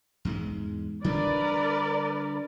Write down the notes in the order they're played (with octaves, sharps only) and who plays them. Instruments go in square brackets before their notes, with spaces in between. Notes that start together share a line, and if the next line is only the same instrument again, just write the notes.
[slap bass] E2 G#2 G#3
[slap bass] D3 G3 D4 [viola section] A#4 B4 D5